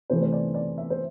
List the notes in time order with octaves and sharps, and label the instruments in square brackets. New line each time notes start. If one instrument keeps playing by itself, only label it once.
[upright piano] C3 E3 A3 C5
C5
D5
D5
E5
C5